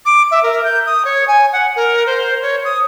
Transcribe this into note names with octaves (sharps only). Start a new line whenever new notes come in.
D6
E5
A#4
G6
D#6
C#5
G#5
F#5
A#4
C5
C#5
D#6